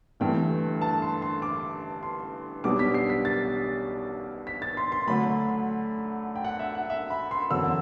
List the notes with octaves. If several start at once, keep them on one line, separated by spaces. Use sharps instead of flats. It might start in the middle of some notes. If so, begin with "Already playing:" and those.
G1 G2 E3 A3 G5
A5
C6
C6
D6
C6
B1 B2 G3 B3 D4 D6
B6
C7
B6
A6
B6
A6
C6
C6
D2 D3 F#3 A3 B5
G5
F#5
E5
F#5
E5
B5
C6
F#1 E2 D3 F#3 E6